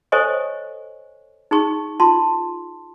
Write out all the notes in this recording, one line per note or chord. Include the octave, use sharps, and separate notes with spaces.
A4 C5 C#5 D#5 G#5 C#6
D#4 G#4 C#6
F4 A5 C6